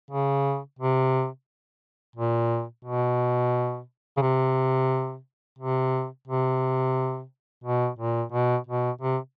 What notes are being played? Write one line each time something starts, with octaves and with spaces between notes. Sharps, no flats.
C#3
C3
A#2
B2
C#3
C3
C3
C3
B2
A#2
B2
B2
C3